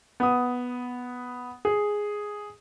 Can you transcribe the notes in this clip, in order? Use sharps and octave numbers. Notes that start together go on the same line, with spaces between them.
B3 D#6
G#4